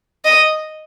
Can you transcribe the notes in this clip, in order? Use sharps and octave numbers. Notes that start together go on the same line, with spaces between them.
D#5